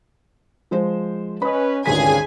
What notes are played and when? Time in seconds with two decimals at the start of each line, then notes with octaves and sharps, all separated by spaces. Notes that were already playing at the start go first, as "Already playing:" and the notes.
0.71 F3 G#3 C5
1.42 C#4 B4 D#5 B5
1.86 G#1 D2 G2 A#2 C#3 G#4 G#5 B6